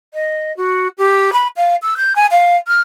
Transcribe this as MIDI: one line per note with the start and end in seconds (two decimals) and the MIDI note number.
0.14 0.55 75
0.57 0.88 66
0.98 1.31 67
1.33 1.48 83
1.56 1.76 77
1.82 1.95 88
1.97 2.13 91
2.16 2.26 80
2.31 2.56 77
2.68 2.82 89